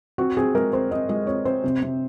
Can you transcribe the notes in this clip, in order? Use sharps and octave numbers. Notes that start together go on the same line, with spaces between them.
C4 F#4
C4 G#4
G#3 A#4
C4 C5
C4 D#5
G#3 D#5
C4 C#5
C4 C5
C3
C3